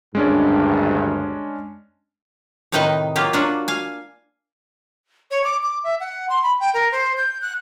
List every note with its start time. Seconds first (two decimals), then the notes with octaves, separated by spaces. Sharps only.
0.15 G#1 D2 G2 G#3 C#4 D4
2.72 A2 C3 D#3 D#4 B4 D#5
3.16 F#3 A#3 F4 G4
3.33 F#3 D4 F4 F#4
3.68 F5 G#5
5.31 C#5
5.44 D6
5.63 D6
5.84 E5
6.00 F#5
6.29 C6
6.43 B5
6.60 G5
6.74 A#4
6.92 C5
7.17 G6
7.42 F#6